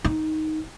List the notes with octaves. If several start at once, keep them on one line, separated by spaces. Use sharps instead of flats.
D#4